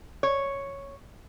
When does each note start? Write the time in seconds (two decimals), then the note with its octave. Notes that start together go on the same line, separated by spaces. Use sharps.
0.23 C#5